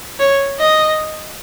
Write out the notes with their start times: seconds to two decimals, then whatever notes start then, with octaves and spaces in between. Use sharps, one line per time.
0.20 C#5
0.60 D#5